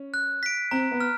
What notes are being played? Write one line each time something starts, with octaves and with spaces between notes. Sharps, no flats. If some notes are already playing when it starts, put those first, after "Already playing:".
Already playing: C#4
F#6
B6 D7
C4 A#5
B3
F6